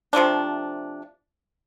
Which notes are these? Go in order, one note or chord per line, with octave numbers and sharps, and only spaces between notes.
C3 F3 A3 D4